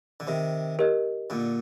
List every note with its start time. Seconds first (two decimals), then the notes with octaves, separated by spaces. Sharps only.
0.20 D3
0.27 C3 D#3
0.79 G4 A#4 D#5
1.30 A#2 D3